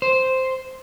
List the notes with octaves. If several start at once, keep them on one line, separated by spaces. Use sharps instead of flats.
C5